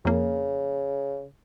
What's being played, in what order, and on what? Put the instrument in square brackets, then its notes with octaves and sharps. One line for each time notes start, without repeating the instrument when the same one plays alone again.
[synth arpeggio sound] F2 A#3 [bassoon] C#3